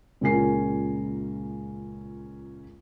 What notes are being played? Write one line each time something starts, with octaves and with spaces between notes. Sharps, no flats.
C#2 A#2 G#3 C#4 A#4 C7